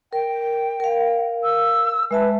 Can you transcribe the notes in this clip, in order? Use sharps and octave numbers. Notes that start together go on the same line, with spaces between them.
A#4 G5
A#4 F5
E6
G#3 B4 E5 A5